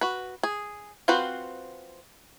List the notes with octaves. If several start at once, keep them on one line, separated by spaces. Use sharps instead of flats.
F#4 B4
G#4
C4 F4 F#4 B4 C5